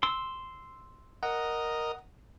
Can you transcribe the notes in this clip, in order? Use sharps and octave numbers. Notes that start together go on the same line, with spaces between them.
C6 E6
A#4 D#5 F#5